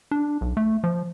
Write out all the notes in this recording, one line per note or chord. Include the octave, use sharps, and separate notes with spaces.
D4
B1
A3
F3